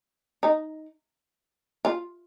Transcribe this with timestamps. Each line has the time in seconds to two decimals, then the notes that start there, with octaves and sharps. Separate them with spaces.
0.43 D#4
1.85 F4